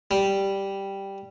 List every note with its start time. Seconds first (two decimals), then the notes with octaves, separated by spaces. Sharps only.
0.11 G3